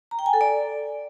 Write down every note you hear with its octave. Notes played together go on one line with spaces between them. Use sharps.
A#5
G5
G#5
A4
D5